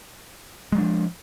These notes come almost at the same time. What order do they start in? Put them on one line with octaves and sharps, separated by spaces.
G#3 F#3 D4 F3